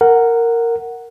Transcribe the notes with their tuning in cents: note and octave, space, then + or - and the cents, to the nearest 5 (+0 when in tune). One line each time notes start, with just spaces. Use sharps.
A#4 -10 F#5 +0